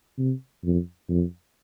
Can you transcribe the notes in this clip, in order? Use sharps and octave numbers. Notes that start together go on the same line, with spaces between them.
C3
F2
F2